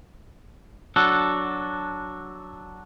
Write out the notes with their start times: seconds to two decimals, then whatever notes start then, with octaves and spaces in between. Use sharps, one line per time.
0.96 F#3 D4 F#4 A4